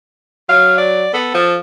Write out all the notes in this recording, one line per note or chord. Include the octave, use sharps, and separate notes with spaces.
F#3 F5
D5
B3 A4
F3